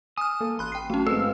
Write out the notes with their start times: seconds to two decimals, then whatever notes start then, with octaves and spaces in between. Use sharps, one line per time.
0.18 G#5 D#6 F6
0.41 A#3 A4
0.59 A1 B5 C6 F#6
0.72 G5 C7
0.90 F#3 A3 C#4
1.07 G#2 B3 C4 A4 F5 E6